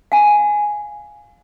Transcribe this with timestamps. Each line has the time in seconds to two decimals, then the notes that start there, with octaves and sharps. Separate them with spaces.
0.12 F5 G#5